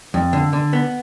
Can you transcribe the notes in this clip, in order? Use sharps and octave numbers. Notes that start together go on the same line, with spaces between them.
F2
D3
D3
B3